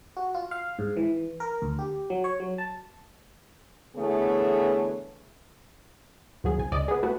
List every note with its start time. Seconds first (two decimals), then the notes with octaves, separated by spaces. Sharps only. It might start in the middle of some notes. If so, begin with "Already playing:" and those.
0.17 F#4
0.35 F4
0.51 F5
0.79 G#2
0.96 E3
1.40 A#4
1.62 D2
1.79 G4
2.10 F#3
2.24 C#5
2.40 F#3
2.58 A5
3.95 D3 E3 A3 B3 G#4 C#5
6.44 D#2 F#3 G#4
6.58 C2 G#5
6.72 C#2 D5 D#5
6.88 B3 G#4
7.03 A3 B3 F#4